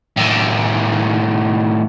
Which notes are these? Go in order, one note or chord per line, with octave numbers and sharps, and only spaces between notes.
A2 D#3